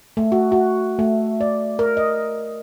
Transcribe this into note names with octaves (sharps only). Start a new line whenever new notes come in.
A3
F#4
F#4
A3
D5
A#4
D#5